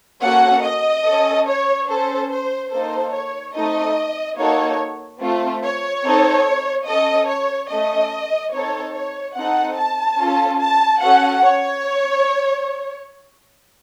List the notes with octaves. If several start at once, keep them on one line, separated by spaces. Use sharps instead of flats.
A#3 C#4 F#4 A4 F#5
D#5
C#4 A4
C#5
C#4 A4 C5
C5
A#3 D#4 A4 C5
C#5
A3 C4 D#4 A4 D#5
A#3 D#4 F#4 A4 C#5
A3 C4 F4
C#5
C4 D#4 A4
C#4 A4 D#5
C#5
A3 C#4 A4 D#5
C4 D#4 A4 C#5
C#5
C4 D#4 A4 F#5
A5
C#4 F4 A4
A5
C#4 F#4 A4 F#5
C#5